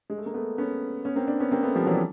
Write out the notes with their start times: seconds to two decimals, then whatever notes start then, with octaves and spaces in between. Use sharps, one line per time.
0.10 G#3
0.18 A3
0.26 A#3
0.34 A3 B3
0.58 B3 C#4
1.05 B3 C#4
1.16 A#3 C4
1.27 C4 D4
1.40 B3 C#4
1.51 A#3 C4
1.63 A3 B3
1.75 F3 G3
1.86 E3 F#3
1.94 G3